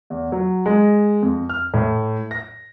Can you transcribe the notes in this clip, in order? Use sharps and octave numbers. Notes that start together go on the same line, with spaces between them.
E2
F#3
G#3
F2
F6
A2
A#6